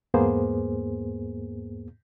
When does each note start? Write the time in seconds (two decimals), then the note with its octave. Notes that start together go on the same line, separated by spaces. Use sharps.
0.14 E2 G#2 A#3 B3 G#4 C5